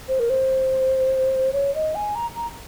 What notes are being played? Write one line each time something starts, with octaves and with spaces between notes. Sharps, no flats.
C5
A#4
C5
C#5
D#5
G#5
A#5
A#5